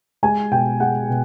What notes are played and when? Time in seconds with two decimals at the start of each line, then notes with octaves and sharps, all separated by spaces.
0.23 G#3 G#5
0.51 B2 G5
0.80 G#3 F#5
1.09 B2